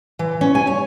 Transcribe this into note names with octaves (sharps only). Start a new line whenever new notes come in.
E3
C#4
G#5
C#5